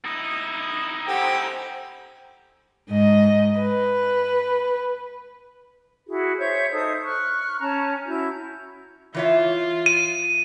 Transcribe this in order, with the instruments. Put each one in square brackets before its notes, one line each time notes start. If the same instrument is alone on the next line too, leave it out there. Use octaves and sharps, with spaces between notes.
[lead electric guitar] D#4 E4 [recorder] D#6
[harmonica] G4 [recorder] A4 [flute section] C5 F#5 G#5
[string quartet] G#2 D#5
B4
[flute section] E4 F#4 G#4
C5 C#5 E5 G6
D#4 A4 C5 D#6
C#6 F6 F#6
C#4 A5 A#5
C#4 E4 F#4 G6
[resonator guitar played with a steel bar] E3 C#5 E5 [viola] F4
[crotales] D#7